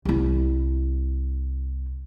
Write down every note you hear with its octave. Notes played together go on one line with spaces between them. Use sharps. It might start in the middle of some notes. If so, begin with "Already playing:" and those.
C2 E4